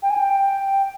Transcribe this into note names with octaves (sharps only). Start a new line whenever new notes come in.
G5
G#5
G5